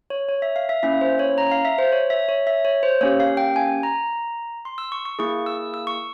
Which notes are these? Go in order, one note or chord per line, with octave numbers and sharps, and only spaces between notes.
C#5
C#5
E5
F5
E5
A#3 C#4 E4 E5
C5
C#5
A#5
F5
E5
C5
C#5
E5
C#5
E5
C#5
C5
A#3 C#4 G4 C#5
F5
G5
G#5
A#5
C6
E6
C#6
C#6
A#3 E4 G#4 C#6
E6
E6
C#6